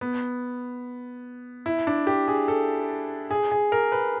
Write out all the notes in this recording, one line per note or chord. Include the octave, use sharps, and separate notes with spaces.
B3
E4
D4
G4
G#4
A4
G#4
G#4
A#4
B4